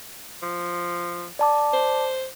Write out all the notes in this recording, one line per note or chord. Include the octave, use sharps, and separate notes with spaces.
F3
D5 A5 D6
C5